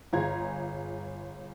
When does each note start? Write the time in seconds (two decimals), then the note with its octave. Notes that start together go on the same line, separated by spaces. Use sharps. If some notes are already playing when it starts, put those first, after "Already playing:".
0.13 G1 F4 G#4 A#5 G#6